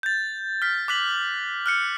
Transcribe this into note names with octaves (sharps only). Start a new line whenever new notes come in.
G6 A6
F6 B6
D6 F#6 B6 F#7
F6 F#6 C#7